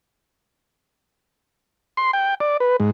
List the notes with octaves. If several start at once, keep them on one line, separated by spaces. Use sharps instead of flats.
C6
G5
D5
B4
G#2